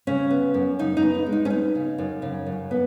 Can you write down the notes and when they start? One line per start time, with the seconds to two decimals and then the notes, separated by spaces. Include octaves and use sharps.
0.07 C#3 C#4
0.30 B3
0.54 F#2
0.79 C#3 D#4
0.97 D#4
1.02 B3
1.15 D#4
1.26 G#3
1.32 D#4
1.45 C#4
1.50 B3 D#4
1.75 C#3
1.98 F#2
2.22 C#3
2.46 F#2
2.71 B3